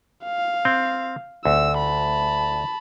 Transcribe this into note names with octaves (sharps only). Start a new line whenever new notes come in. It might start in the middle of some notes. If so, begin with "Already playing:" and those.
F5
C4
D2 E6
A5 B5